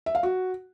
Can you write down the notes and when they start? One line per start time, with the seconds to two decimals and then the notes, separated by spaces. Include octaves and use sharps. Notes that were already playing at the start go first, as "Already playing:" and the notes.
0.06 E5
0.15 F5
0.23 F#4